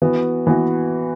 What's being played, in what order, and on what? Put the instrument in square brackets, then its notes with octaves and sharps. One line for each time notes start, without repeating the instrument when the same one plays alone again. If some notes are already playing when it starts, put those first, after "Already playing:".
[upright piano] E3 B3 F#4
E3 B3 F#4